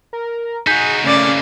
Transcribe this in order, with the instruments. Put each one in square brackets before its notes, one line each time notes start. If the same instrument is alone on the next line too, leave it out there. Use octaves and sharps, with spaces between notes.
[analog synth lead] A#4
[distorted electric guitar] D#4 F#4 [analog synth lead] G#4 [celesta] G6 B6
[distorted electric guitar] C#3 A#3 [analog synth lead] A3 [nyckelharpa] C#4 D5